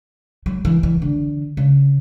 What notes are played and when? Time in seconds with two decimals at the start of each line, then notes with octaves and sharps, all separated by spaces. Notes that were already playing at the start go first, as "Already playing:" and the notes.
0.46 F#3
0.65 E3
0.83 E3
1.02 D3
1.57 C#3